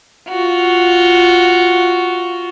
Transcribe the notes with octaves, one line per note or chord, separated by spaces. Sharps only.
F4 F#4